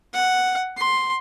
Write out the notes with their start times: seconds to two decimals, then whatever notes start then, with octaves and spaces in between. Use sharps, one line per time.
0.14 F#5
0.77 C6